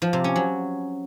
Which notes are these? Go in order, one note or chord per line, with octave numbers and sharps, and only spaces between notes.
F3
C3
C#4
F#3